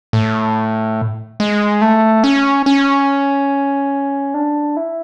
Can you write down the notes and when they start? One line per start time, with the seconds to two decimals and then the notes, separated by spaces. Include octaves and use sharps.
0.13 A2
1.40 G#3
1.81 A3
2.24 C#4
2.66 C#4
4.34 D4
4.77 E4